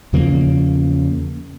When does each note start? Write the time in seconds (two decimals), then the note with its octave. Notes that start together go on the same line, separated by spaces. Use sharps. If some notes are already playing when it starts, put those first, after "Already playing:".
0.13 E2 C#3 F3 A#3